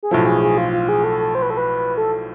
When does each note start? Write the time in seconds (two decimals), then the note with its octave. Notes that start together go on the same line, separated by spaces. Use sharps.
0.03 G#4
0.11 B1 A2 F3 A4
0.26 G#4
0.42 G#4
0.58 F4
0.73 F4
0.89 G#4
1.04 A4
1.20 A4
1.35 C5
1.42 B4
1.50 A4
1.57 B4
1.97 A4